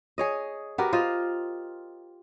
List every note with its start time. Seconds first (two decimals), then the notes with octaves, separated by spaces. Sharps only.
0.18 G#4 C#5 D#5
0.78 B3 F#4 G4 A#4
0.93 F4 C5 D#5